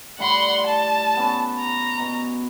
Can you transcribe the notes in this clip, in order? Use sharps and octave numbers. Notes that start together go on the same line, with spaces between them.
A2 G3 F#5 B5 C6
A5
B3 C#4
A#5
B2